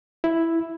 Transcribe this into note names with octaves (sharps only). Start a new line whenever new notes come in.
E4